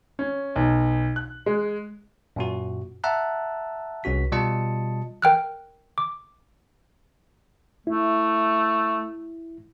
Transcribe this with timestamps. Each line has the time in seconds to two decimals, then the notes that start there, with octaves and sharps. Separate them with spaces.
0.19 C#4
0.56 B1
1.16 F#6
1.46 G#3
2.36 F#2 A#2 F#4
3.04 E5 F#5 A5 A#5 E6 F#6
4.04 C2 C#4 F#4 B6
4.32 B2 G3 F4 D#5 A5 C#7
5.22 A#4 G5 F6 F#6
5.98 D6
7.87 A3 E4